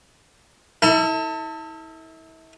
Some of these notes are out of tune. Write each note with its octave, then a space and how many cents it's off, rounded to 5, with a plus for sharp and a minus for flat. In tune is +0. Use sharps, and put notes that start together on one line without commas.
E4 -35 A4 +30